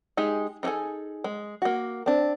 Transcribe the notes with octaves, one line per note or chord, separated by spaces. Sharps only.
G#3 D#4 G4 G#4
D#4 E4 G#4 A4 G#5
G#3
A#3 F#4
C4 D4